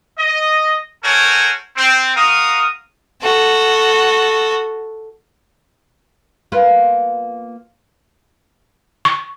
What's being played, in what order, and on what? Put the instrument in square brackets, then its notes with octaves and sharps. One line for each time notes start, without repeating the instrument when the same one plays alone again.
[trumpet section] D#5
F#4 A4 A#4 C5 C#5 G#5
C4
F#4 A#4 F5 D#6
[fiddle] F#4 A4
[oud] A#3 B3 F4
[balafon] C#6